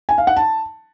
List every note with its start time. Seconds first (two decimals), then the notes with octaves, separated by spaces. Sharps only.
0.09 G#5
0.18 F5
0.27 F#5
0.36 A5